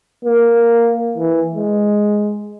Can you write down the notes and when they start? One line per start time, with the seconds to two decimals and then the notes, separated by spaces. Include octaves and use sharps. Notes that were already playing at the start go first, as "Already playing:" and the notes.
0.25 A#3
1.18 E3
1.55 G#3